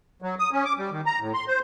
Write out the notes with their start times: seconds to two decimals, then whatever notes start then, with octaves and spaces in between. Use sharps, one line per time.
0.22 F#3
0.39 D#6
0.52 C#4
0.65 D6
0.78 G3
0.91 D#3
1.06 A#5
1.20 A2
1.34 C6
1.48 C5